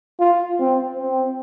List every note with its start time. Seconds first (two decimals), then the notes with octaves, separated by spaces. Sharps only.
0.19 F4
0.60 C4
0.99 C4